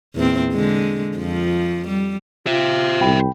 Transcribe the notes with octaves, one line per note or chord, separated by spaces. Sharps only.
E2 A#2 C4
D3 G#3
F2 F3
G3
F4 C5 E5
C2 G5 B5